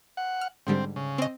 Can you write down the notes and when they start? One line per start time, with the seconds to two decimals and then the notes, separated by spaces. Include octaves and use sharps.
0.17 F#5
0.41 F6
0.67 G#2 D3 G3 C4
0.96 C#3
1.18 C4 D#5